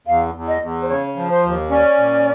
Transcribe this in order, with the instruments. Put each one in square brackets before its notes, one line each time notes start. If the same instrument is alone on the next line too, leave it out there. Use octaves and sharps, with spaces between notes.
[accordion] E2 [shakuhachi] F5
[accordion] E2
[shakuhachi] D#5
[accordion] E2
[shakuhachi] C5
[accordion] C#3 [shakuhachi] C#5
[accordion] F3
[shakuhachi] C5
[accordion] D#2
[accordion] C#4 [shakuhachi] D5
[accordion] A#2